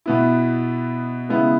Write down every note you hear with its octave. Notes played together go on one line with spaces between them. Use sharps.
B2 B3 E4
C#3 G#3 B3 E4